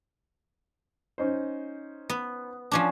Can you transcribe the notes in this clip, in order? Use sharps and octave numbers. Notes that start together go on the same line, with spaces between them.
C#4 D#4 C5
B3
F3 C#4 D4